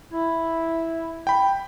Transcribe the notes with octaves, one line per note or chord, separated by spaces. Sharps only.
E4
G5 B5